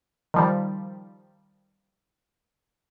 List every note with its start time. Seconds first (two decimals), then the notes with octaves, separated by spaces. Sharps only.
0.34 D#3 F3 G3